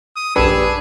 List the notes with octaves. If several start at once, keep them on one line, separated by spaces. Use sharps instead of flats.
D#6
A#1 F#2 D4 G4 G#4 B4 E6